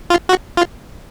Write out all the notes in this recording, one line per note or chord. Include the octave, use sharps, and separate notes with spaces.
F4
F#4
F4